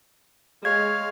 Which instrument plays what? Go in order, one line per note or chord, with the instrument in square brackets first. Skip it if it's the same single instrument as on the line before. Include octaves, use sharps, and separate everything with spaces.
[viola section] G#3 [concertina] C#5 F5 [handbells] G#6